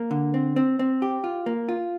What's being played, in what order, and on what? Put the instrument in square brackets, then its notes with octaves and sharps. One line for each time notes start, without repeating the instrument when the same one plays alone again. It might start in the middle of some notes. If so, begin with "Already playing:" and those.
Already playing: [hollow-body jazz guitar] A#3
D3
C4
C4
C4
G4
F4
A#3
F4